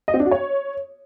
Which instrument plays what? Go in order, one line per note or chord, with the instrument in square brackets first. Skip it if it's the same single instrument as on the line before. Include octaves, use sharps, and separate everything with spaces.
[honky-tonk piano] D#5
C4
D4
F#4
C#5